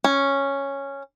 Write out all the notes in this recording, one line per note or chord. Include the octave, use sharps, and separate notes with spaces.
C#4